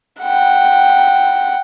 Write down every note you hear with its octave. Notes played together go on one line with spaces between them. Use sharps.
F#5 G5